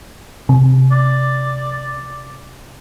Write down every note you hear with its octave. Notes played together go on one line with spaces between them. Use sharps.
C3
D5